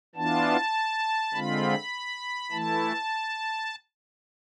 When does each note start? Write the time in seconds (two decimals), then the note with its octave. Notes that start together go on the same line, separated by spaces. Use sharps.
0.15 E3 B3 D4 F4 A5
1.33 D3 G#3 C4 F4 B5
2.51 E3 A3 E4 A5